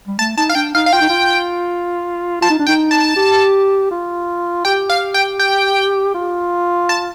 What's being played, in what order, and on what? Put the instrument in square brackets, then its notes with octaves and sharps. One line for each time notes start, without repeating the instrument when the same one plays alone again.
[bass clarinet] G3
[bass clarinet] A3 [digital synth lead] A5
[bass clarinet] D#4 [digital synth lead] A5
[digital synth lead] F5
[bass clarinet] D4 [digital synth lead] G5
[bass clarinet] D#4 [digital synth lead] F5
[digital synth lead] F5
[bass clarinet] F4 [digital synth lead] G5
[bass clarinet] D#4
F4
[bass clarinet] F4 [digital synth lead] A5
[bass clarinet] D#4
D4
[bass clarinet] D#4 [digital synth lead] G5
[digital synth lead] A5
[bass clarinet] G4
F4
[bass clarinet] G4 [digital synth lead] G5
[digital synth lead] F5
G5
G5
[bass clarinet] F4
[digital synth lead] A5